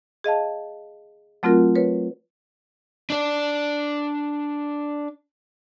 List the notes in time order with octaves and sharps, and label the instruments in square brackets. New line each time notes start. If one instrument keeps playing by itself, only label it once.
[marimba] G#4 D#5 F5 A5
F#3 A3 C4 F4 F#4 A#4
B4 C#5
[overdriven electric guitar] D4 D5